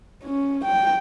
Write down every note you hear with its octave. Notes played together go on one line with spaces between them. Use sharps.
C#4
G5